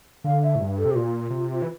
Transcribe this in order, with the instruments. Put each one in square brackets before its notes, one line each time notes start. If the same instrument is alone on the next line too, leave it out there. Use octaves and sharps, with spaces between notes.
[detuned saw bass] D3 [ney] F5
[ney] E5
[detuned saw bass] A2
G2
[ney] A4
[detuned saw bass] C3
[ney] G4
[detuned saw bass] A#2 [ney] F4
[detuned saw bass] C3
E3